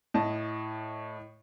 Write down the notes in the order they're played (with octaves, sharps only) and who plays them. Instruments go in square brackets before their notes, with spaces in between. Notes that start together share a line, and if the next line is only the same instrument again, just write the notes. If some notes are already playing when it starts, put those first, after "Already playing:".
[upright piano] A2 D#5 A5